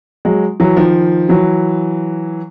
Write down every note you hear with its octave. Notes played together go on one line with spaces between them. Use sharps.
F#3 G#3
E3 F#3
D#3 F3
E3 F#3